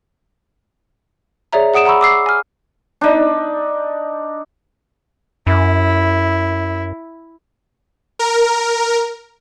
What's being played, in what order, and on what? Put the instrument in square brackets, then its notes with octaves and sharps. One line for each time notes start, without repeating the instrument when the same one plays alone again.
[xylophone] G#4 C#5 D5 E5 A#5
G#4 F#5 D#6 D7 E7
F#5 A#5 B5 C#6 E6
D6 E6 C7
G#5 F6
[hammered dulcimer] D4 D#4
[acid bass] F#2 [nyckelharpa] E4
[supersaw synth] A#4